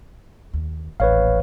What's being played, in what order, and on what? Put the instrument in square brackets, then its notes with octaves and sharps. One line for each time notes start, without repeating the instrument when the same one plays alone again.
[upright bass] D#2
[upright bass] D#1 A1 [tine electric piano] B4 C#5 F5